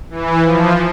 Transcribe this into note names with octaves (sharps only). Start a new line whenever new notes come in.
E3
F3